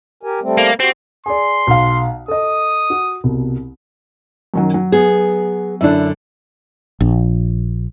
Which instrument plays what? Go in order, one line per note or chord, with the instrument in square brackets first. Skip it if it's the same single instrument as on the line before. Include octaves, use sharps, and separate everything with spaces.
[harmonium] G4 A#4 G#5
G3 A3 C4
[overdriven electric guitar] A#3
[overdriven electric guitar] C4 [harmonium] F#4 G4 C5
[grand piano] G#4 D5 [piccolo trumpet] C6
[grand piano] B1 F5
[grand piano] A4 D#5 [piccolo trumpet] D#6
[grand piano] F#4
C2 B2
[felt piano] F#2 D#3 F#3
F#3
[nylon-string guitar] B3 G#4
[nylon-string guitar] F#2 D3 [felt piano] D4 E4 E5
[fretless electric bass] A#1